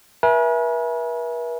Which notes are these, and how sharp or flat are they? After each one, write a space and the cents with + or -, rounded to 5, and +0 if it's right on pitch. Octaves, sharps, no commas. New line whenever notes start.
B4 -45 E5 +0 G#5 +20